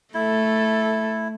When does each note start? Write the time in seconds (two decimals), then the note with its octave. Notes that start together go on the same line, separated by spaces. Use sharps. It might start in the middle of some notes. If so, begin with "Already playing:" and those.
0.14 A3 E4 A4